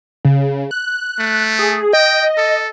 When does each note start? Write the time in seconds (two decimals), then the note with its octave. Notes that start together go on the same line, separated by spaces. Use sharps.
0.25 C#3
0.71 F#6
1.19 A3
1.59 G#4
1.93 D#5 G5
2.37 A4